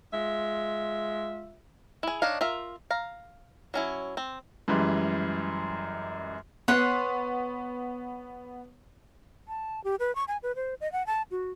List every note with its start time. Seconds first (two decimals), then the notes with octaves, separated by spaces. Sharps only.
0.13 G#3 F4 E5
2.03 E4 G#4
2.22 D4 D#4 C#5 D#5 F5
2.41 F4 A#4 E5
2.91 F5 A#5
3.74 F#3 C#4 E4
4.17 C4
4.68 F#2 E3 G3 G#3
6.68 B3 C#5 F#5 C6
9.48 A5
9.84 G4
10.00 B4
10.15 C#6
10.28 G#5
10.43 B4
10.56 C5
10.81 D#5
10.92 F#5
11.07 A5
11.31 F#4